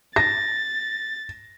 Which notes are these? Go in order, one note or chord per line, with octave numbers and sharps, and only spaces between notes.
A6 A#6